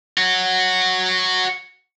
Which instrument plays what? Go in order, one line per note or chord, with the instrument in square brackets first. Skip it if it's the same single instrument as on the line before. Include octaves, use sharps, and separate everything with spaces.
[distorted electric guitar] F#4 C#5